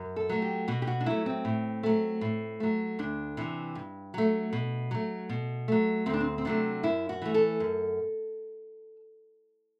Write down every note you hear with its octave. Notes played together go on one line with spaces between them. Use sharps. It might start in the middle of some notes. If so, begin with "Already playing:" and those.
Already playing: F#2
A4
F#3 A3
G4
B2 F#4
G4
F#4
D4
F#3 A3 E4
C4
A2
F#3 A3
A2
F#3 A3
D2 D4
C3 E3
G2
F#3 A3
B2
F#3 A3
B2
F#3 A3
D2 C4
D4
C4
C4
C3 F#3 A3 D4
F#2 E4
F#4
E3 A3
A4
F#2